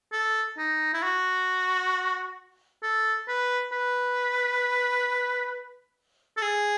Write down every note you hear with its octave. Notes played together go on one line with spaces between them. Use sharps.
A4
D#4
E4
F#4
A4
B4
B4
A4
G#4